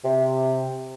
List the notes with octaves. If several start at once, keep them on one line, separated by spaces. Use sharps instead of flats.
C3